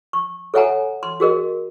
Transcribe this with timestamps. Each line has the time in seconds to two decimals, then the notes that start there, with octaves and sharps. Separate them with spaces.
0.13 C#6
0.54 A4 C#5 E5 F#5 G#5 A#5
1.03 C6
1.20 F#4 G#4 A#4 D#5